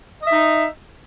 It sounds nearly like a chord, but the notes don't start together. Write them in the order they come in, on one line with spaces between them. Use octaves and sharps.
D#5 E5 D#4